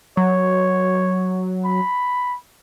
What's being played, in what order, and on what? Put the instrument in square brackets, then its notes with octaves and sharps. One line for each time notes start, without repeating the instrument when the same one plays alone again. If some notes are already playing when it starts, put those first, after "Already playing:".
[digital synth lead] F#3 [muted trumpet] C#5
[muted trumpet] B5